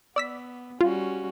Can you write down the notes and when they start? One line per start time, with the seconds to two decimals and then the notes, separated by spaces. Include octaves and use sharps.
0.16 B3 D5 E6 B6
0.81 G3 C#4 F4 F#4